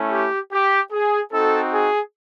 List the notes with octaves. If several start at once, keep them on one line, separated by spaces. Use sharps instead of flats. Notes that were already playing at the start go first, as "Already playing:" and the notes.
Already playing: A3 C#4 E4
G4
G4
G#4
C4 D#4 F#4 A4
G#4